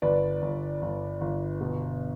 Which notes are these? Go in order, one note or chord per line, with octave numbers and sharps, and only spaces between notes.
G1 B4 D5
G1
G1
G1
B2